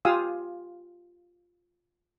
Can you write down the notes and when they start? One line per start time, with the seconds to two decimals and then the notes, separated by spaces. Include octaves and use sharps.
0.05 F4 G4 F5 G#5 D#6 E6